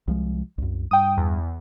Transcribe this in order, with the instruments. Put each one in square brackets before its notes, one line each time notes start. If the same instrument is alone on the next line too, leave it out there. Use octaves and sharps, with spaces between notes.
[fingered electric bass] C2 F3 G#3
C2 F#2
[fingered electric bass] G2 [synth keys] G5 D#6
[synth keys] E2